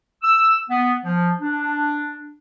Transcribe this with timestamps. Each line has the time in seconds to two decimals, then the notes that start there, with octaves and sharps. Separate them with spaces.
0.23 E6
0.70 B3
1.04 F3
1.41 D4